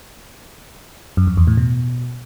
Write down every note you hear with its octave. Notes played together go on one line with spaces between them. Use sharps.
F#2
F2
E2
A2
B2